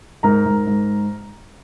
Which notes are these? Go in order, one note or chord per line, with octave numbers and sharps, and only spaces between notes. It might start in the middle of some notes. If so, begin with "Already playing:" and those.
G#2 A#4 A#5
G#2
G#2